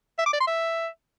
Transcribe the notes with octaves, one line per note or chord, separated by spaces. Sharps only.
E5
D6
D5
C6
E5